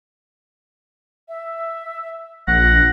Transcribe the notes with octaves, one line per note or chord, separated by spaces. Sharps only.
E5
A#1 F#5 A#6